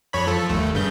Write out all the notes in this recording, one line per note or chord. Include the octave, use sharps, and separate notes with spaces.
F2 C#5 B5
F3 A4
G1 D#2 A3
G2 C#3 G6